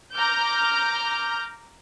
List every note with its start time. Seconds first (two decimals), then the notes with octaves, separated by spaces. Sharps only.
0.15 A#5 D6 F6 G6